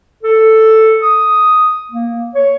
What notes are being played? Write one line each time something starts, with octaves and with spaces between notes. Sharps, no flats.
A4
D#6
A#3
C#5